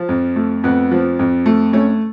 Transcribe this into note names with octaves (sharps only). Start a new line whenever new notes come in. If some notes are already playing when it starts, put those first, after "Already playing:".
Already playing: F3
F2
A3
F2 B3
F3
F2
A3
A3 C#4